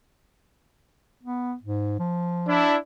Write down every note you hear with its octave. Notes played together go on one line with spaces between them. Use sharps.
B3
G#2
F3
D4 E4